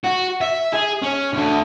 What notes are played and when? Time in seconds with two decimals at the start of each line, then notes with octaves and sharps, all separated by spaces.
0.04 F#4
0.41 E5
0.73 G#4
1.02 C#4
1.33 D2 D3